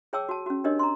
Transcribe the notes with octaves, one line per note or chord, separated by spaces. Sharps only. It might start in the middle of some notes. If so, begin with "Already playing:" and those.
G#4 C#5 G5 A5 D6 E6
F#4 A5
C#4 F#4
D4 G4 A#4 C#5 D#5
A#5 C6